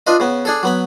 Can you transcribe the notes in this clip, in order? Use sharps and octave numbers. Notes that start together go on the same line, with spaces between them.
D4 F4 B4 D#5
C#3 B3
D4 G#4 A4
F#3 B3 B5